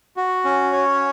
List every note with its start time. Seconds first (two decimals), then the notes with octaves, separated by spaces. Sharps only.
0.17 F#4
0.45 C#4
0.72 C#5